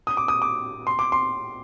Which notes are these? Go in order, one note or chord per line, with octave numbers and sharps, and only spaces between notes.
D#6
D6
D#6
D6
C6
D6
C6